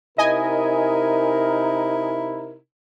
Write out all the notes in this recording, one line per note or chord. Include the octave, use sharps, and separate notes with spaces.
C3 D#4 E4 A#4 D#5 G#5